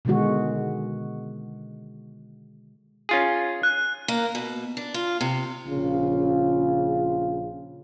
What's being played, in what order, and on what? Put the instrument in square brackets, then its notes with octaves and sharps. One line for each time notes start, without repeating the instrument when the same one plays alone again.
[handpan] B2 D3 D#3 G#3 F#4
[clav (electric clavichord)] C#4 F4 G#4
[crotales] F#6
[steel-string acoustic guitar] A#3
B2
D4
F4
C3
[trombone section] A#1 C#3 F4